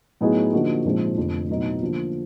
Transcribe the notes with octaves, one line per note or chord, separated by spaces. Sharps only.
A2 F#3 B3 D#4 G#4
D3 F3 A#3 D#4 F#4
A#1 G#2 F3 G#3 C4
F1 F2 D3
B1 A2 F#3 B3 D#4
D3 F3 A#3